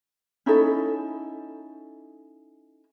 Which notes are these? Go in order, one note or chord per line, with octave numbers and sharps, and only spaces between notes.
C#4 D#4 E4 A4